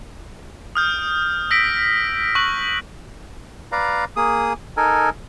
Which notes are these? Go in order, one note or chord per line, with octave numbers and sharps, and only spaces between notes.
D#6 F6 G6
E6 A#6 B6 D7
C#6 F#6 F#7
B4 D5 F5 A#5
A#3 G#4 D#6
D#4 A4 A#4 G#5